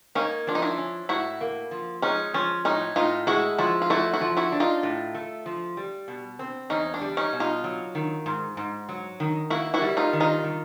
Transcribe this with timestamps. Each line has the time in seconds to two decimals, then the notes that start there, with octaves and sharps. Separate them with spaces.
0.15 A#3 C#4 D#4
0.47 F3 D4
0.55 D#4
0.62 D4 E4
0.78 C#4
1.09 A2 E4 F#4
1.41 A#3
1.71 F3
2.02 G#3 C#4 D#4
2.34 F3 C#4
2.65 A2 C#4 D#4
2.96 A2 D#4 F4
3.27 G#3 E4 F#4
3.58 F3 E4 F#4
3.82 F4
3.90 A3 E4 F#4
4.13 E4 F#4
4.21 F3
4.37 E4 F#4
4.52 D4
4.60 D#4 F4
4.83 A2
5.14 A3
5.46 F3
5.77 G3
6.08 B2
6.39 C4
6.70 E2 C#4 D#4
6.94 D4
7.01 G3
7.17 C#4 D#4
7.33 B2
7.40 D#4 F4
7.64 F#3
7.95 D#3
8.26 G#2
8.57 G#2
8.89 F#3
9.20 D#3
9.50 A#3 E4 F#4
9.74 E4 F#4
9.82 G3
9.97 D#4 F4
10.13 D#3
10.20 D#4 F4
10.44 D#3